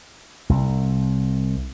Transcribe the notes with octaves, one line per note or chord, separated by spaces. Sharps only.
C2